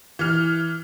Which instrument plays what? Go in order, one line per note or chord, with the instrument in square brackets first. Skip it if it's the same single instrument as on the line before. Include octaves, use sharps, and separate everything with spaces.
[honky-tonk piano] E3 F6